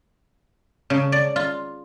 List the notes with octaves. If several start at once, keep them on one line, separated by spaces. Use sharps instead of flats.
C#3
D5
F4